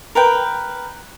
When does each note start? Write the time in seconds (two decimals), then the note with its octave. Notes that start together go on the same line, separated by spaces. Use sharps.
0.15 A#4 B4 G5